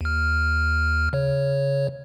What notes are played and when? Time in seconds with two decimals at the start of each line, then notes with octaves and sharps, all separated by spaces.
0.01 D#2 F6
1.13 C#3 C#5